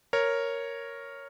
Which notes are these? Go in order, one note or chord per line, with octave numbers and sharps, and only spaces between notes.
A#4 C#5